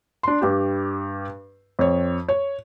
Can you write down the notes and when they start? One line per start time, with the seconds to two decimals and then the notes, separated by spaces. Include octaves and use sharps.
0.23 D4 C6
0.41 G2 G4
1.79 F2 C#5
2.28 C#5